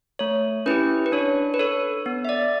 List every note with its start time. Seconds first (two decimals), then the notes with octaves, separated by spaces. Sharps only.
0.19 A3 C#5
0.66 C#4 E4 G4 B4
1.06 B4
1.12 D4 C#5
1.54 B4
1.59 A4 C#5
2.06 B3
2.25 E5
2.29 D5